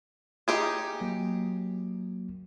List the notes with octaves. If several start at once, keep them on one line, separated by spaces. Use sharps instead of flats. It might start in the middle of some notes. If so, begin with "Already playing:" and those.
D#4 G4 G#4
F#3 A#3